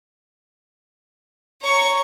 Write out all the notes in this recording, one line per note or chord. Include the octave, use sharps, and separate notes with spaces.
C#5 A#5 C#6